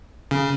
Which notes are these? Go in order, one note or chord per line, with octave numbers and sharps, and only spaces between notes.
C#3